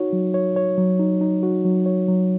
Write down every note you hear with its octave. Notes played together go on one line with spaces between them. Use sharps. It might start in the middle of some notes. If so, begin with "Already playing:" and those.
Already playing: D#4 F#4 C#5
F#3
C#5
C#5
F#3
D#4
D#4
F#4
F#3
C#5
F#3